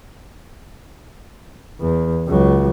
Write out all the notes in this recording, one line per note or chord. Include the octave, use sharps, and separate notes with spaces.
E2
C#2 F#3